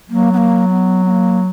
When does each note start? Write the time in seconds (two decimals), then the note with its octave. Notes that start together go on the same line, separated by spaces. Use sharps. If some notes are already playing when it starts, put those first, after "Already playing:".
0.10 F#3 A#3
0.33 B3
0.37 A#3
0.69 B3
1.05 B3
1.10 A#3